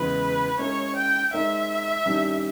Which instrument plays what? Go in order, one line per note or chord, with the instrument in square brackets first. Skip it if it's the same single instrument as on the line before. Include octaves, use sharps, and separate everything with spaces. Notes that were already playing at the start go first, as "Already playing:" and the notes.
Already playing: [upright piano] E2 C#3 E3 G#3 [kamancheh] B4
[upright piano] G#3 C#4 E4 A#4 [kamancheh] C#5
[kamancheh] G5
[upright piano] G#3 D#4 A#4 C#5 [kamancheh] E5
[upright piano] G2 D#3 G3 C#4 G4